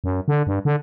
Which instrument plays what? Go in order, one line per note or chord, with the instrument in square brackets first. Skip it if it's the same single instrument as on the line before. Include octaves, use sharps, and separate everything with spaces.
[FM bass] F#2
D3
G2
D3